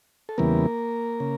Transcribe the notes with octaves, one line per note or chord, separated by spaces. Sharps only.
A4
E2 C#3 E3 G3 A#3 B3 A#4
C#3